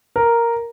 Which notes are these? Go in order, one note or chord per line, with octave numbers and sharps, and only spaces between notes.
A#4